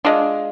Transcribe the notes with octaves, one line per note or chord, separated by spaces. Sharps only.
G#3 D4 F4